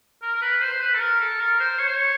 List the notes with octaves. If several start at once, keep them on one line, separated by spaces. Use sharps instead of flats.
A#4
A#4
B4
C5
C5
B4
A4
A#4
A4
A#4
C5
C#5
C5
C#5